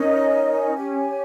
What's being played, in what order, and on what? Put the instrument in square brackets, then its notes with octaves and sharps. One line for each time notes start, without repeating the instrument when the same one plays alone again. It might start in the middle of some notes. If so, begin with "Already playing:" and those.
Already playing: [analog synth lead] C#4 [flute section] D#4 A#4 D#5
[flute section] G4 C#5 G#5